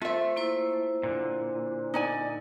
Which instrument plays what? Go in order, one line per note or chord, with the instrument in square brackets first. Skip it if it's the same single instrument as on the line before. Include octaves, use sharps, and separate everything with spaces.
[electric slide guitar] A3 [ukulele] F4 E5 [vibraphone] C5 C6
[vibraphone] A#3 E4 C5
[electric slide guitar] A#2 D3
[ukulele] D#4 D5 G#5